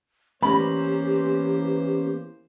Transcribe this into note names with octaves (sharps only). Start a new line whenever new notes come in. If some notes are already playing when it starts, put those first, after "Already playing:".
E3 A#3 B3 C#4 G4 A#4 C5 B5